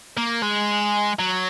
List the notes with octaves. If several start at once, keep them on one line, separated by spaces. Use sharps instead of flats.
A#3
G#3
F#3